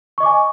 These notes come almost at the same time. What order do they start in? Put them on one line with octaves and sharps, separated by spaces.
C#6 D#5 D6 G#5